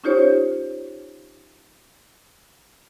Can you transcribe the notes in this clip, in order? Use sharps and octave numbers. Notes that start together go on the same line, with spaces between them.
C#4 D#4 F4 G4 C5 C#5